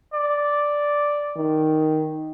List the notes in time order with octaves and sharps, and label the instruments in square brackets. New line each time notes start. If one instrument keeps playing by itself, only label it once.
[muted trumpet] D5
[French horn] D#3